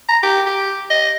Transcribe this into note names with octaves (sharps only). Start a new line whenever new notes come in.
A#5
G4
G4
D#5